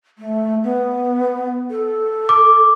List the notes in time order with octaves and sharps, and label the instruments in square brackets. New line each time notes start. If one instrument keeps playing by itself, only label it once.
[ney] A3
B3
A4
[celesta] D6